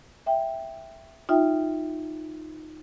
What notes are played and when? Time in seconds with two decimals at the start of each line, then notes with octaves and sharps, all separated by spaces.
0.26 E5 G5
1.29 D#4 F4 E5 G5